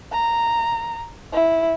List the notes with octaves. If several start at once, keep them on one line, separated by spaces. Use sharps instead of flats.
A#5
E4